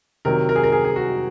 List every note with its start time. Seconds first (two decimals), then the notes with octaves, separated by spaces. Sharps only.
0.25 C3 D#3 F#3 A#4
0.49 A#4
0.56 G#4
0.64 A#4
0.72 G#4
0.85 G#4
0.96 F#4